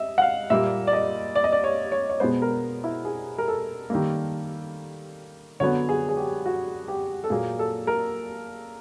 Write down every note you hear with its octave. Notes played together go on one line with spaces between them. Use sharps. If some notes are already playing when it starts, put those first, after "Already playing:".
Already playing: D#5 E5
F#5
F5
A#2 G3 A#3 E5
D5
D#5
D5
D#5
D5
C#5
C#5
C#5
B2 G#3 B3 C5
A#4
E4
G#4
A#4
A4
D#3 G3 A#3
D3 F#3 B3 C#5
G#4
G#4
G4
F#4
G4
A4
A#2 F#3 A#3 G#4
A4
A#4